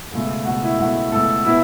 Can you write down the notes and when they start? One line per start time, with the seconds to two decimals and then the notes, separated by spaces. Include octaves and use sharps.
0.12 C#2 B2 A3
0.45 C#2 B2 A3 F#4
0.62 E4
0.78 C#2 B2 A3 F#4
1.12 C#2 B2 A3 A4
1.44 B2 B3 E4